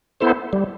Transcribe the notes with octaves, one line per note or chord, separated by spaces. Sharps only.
B3 E4 A4 C5
G3